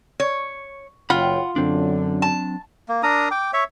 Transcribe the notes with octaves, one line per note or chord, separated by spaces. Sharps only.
C#5
F#1 F4 C#5 F#5 G5 B5
F#2 D3 F#3 C4 D4
A5
A#3
D4 A#4 A#5 D#6
G5 D6
C#5 E5 C#6